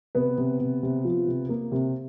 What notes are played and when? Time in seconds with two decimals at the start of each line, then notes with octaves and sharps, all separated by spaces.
0.15 C3 B3 B4
0.38 C3
0.60 C3
0.83 C3
1.05 F3
1.28 C3
1.49 A#3
1.72 C3